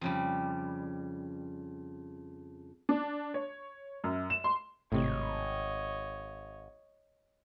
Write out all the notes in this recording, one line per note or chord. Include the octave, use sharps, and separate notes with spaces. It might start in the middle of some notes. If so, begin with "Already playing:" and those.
F2 C#3 G3
D4
C#5
F#2
E7
C6
G#1 A2 C3 C#5 D#5